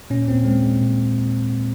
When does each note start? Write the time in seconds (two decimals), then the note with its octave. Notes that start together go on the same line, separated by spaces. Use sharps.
0.10 A#2 C#4
0.28 A#2 C4
0.45 G#3 C4
0.63 G#3
0.81 A#2